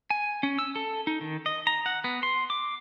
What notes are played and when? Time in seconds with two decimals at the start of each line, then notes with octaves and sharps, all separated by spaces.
0.10 G#5
0.43 C#4
0.59 E6
0.76 A4
1.07 D#4
1.21 D#3
1.46 D#5
1.67 A#5
1.86 F#5
2.04 B3
2.23 C6
2.50 D6